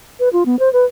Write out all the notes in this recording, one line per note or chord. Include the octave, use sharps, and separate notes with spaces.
B4
F4
B3
C5
B4